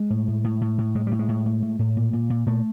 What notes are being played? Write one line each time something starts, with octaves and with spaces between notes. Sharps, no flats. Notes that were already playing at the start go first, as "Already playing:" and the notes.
Already playing: G#3
A2
A2
A2
A2
A2
A2 G#3
A2 G3
G#3
A2
A2
A2
A2
A#2
A#2
A#2
A#2 A3